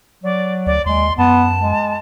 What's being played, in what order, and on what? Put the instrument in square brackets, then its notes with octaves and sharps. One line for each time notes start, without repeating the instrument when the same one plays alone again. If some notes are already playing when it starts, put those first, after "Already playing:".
[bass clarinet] F#3 [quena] D5
[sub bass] D2 [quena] D5
[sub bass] D#2 [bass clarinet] G#3 [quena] C6
[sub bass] F#2 [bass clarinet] B3 [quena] A5
[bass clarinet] G#3